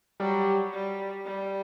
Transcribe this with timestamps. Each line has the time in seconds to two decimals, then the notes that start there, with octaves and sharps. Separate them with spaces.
0.20 F#3 G3
0.73 G3
1.26 G3